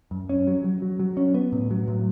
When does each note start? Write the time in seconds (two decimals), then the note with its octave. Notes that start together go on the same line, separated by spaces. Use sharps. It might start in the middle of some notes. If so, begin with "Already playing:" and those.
0.11 F#2
0.29 C#4
0.47 F#3
0.64 F#3
0.82 F#3
1.00 F#3
1.17 C#4
1.34 B3
1.52 A2
1.71 F#3
1.88 A2